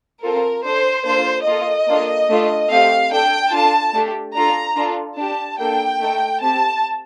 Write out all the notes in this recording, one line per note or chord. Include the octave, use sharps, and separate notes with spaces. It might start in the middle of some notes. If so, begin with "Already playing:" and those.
C4 F4 A4 A#4
D4 A4 C5
A#3 D4 F4 A4 C5
A#3 F4 A4 D#5
A#3 D4 F4 A4
A3 D4 F4
A3 C4 G4 F5
D4 A4 G5
D4 F4 A4 A5
A3 D4 G4
D4 F4 A4 A#5
D4 F4 A4
D4 G4 A5
A#3 D4 A4 G5
A3 D#4 A4
C4 G4 A5